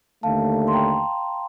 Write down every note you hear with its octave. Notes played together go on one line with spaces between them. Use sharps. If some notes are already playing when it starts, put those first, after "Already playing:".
D#2 D3 A3 F5 A5
C6
G5 A#5